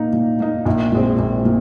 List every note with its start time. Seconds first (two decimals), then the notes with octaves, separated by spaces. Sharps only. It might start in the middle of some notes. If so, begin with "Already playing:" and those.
Already playing: A#2 A#3 D#4
0.13 A#2
0.40 A#3 D#4
0.66 A#1
0.92 A#2 G#3 C4
1.19 A#1
1.45 A#2